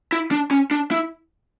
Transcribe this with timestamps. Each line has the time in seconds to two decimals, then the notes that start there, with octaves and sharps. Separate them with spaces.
0.12 E4
0.31 D4
0.51 C#4
0.71 D4
0.91 E4